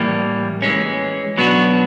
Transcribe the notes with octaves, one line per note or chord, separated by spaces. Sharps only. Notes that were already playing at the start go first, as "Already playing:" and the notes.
Already playing: A2 E3 G3 A#3
E3 G#3 C#4
B2 F#3 B3 D4 F#4